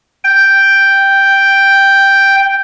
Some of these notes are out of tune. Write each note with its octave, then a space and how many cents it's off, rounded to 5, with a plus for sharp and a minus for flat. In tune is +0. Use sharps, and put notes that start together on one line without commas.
G5 +0